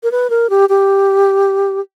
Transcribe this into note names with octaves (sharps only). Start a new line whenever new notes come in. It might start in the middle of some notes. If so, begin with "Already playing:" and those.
A#4
B4
A#4
G4
G4